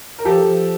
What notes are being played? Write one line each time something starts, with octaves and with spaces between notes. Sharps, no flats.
A#4
F3 G4 A4
F3